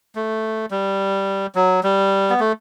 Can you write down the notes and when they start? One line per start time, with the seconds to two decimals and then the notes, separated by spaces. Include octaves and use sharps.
0.15 A3
0.71 G3
1.55 F#3
1.83 G3
2.30 B3
2.40 A3